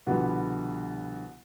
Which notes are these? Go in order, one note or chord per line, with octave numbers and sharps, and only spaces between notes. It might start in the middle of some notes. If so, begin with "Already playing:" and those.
C2 B2 D3 F3 G3 B3